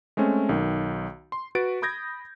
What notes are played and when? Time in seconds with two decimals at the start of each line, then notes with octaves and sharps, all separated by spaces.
0.17 G#3 A3 C4 C#4
0.49 B1 D#3
1.32 C6
1.55 F#4 B4 A6 D7
1.82 B5 D#6 G6 G#6 A#6